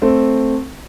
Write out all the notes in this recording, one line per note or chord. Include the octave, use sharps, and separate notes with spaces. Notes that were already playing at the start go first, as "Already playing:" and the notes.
A3 C4